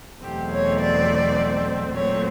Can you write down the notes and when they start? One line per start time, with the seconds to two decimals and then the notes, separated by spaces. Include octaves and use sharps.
0.23 E2 B2 F#3 A3 C4 G4
0.52 C#5
0.80 D5
1.95 A#2 F#3 A3 C4 C#5